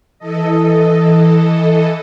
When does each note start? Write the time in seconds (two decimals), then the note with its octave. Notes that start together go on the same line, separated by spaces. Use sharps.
0.19 E3 A4 D#5